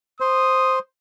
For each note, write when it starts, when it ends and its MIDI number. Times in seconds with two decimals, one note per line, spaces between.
0.20 0.79 72
0.20 0.79 87